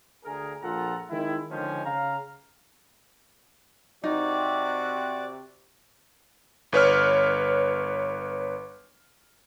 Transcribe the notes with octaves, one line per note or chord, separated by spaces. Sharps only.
D2 G#4 A#4
A#1 A#2 F4 A4 F#5 A#5
D#3 G#3 C4 E4
D3 D#3 F3 G#3 C#4 C5
C#3 F5 A#5
C3 D#4 F#4 D5
G1 B4 C#5 F6